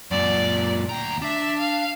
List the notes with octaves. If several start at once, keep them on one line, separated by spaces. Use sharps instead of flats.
F#2 A#2 D5
D2 G5 A#5
D4 E5
F5